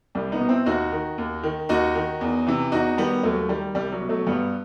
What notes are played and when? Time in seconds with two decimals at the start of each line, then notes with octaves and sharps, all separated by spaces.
0.15 C2 G3
0.32 B3 D#4
0.41 B2
0.49 C4 E4
0.66 D#2 D#4 F#4
0.92 D#3
1.18 D#2
1.43 D#3
1.69 D#2 D#4 F#4
1.95 D#3
2.21 E2
2.47 C3 E3
2.72 E2 D#4 F#4
2.98 D#3 G3 B3
3.23 D#2 F#3 A3
3.49 D#3 G3
3.75 C2 G3
3.92 F#3
4.01 B2
4.09 F#3 A3
4.26 G2 G3 B3